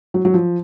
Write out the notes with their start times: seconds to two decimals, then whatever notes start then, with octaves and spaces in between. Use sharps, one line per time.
0.14 F#3
0.25 F#3
0.34 F3